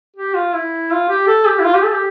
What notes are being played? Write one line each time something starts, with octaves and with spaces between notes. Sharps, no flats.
G4
F4
E4
F4
G4
A4
G4
E4
F4
G4
A4
G4